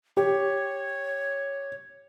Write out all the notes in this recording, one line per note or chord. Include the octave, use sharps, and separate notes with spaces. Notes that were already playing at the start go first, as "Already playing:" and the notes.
G4 C#5